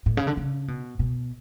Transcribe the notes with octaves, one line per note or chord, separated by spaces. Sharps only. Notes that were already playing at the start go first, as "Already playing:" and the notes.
A2
C#3
D3
C#3
B2
B2